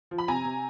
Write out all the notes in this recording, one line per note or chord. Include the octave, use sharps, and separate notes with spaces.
F3
B5
C3 G#5 A#5
C3